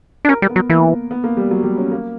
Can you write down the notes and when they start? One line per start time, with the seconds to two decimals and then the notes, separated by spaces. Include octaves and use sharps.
0.25 D4
0.29 C#4 A#4
0.42 G3
0.49 B3
0.56 F#3
0.69 E3 A#3
1.11 B3
1.24 A#3
1.37 G3
1.51 F#3
1.63 G3
1.77 C#4
1.91 A#3